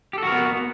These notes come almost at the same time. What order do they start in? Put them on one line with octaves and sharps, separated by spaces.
G4 A4 F#4 A#4 B3